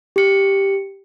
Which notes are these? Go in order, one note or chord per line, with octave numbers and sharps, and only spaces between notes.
G4 C#7